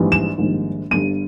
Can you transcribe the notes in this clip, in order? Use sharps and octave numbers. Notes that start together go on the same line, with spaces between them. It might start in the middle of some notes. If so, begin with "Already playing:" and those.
Already playing: A#1 G#2 E3 G3
E7
A#1 G#2 D#3 G3
G1 G2 G3 D#7